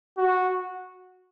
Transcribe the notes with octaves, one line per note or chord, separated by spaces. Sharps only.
F#4